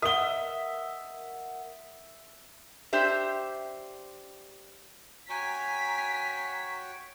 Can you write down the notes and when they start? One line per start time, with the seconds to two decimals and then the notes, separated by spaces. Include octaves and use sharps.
0.02 A#4 E5 F#5 D#6 G7
2.93 D4 G4 C5 E5
5.29 F#4 C#5 G5 G#5 A#5 B6